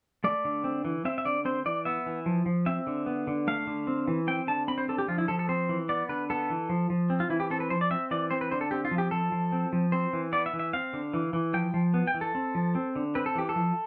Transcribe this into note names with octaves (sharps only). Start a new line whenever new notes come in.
A3 D5
D3
C4
E3
C4 E5
E5
D3 D5
C4 C5
E3 D5
B3 E5
E3
F3
F3
C4 E5
D3
B3
D3
A3 F5
D3
C4
E3
C4 G5
D3 A5
C4 B5
C5
D3 A4
G4
F3 F4
E4
F3 A4
A4
C4 C5
E3
B3 D5
D3 B4
B3 A4
E3
F3
F3
C4
F4
E3 E4
G4
C4 A4
B4
F3 C5
D5
C4 E5
E3 D5
C4 C5
B4
D3 C5
A4
C4 G4
F4
F3
G4
F3 A4
F3
C4
F3
C4 C5
E3
B3 D5
E5
E3
E5
C4 F5
D3
E3
E3
F3 G5
F3
B3
G5
E3
A4
C4
F3
C4
D3
C4 B4
A4
E3 G4
A4
F3